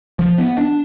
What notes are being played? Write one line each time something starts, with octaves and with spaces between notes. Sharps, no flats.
F3
B3
D4